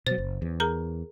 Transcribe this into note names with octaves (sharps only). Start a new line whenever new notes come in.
B2 F#3 C5 A6
F#1
E2
G#4 A#4 A#5